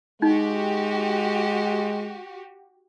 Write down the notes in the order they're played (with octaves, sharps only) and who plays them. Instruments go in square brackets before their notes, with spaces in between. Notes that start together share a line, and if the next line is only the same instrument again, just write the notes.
[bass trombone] G#3 [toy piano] D#4 [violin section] F#4 G4